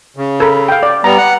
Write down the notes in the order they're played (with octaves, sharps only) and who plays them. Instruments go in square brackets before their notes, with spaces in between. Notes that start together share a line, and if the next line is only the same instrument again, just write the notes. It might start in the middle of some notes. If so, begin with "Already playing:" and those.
[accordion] C#3
[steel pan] A4 A#4 B5
F5 G5
D5
[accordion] G3 B3 [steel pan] A#5
[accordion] F#5